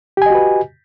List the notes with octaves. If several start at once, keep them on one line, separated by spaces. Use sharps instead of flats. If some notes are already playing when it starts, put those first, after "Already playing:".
F#4 G4 B4 D#5 G#5